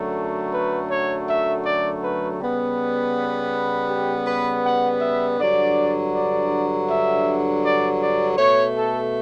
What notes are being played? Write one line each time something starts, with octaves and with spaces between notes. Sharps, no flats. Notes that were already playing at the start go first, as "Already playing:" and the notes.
Already playing: F#2 D3 F#3 A3
B4
C#5
E5
D5
B4
C#3 G3 B3
G4
B4
F#5
E5
G2 D3 F#3 D5
D5
E5
D5
D5
B2 A3 C#5
A4